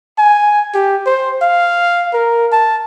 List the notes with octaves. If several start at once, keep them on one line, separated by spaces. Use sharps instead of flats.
G#5
G4
C5
F5
A#4
A5